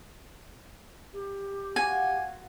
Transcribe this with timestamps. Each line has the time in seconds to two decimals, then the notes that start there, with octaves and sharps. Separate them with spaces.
1.14 G4
1.76 F4 F#4 F#5 G#5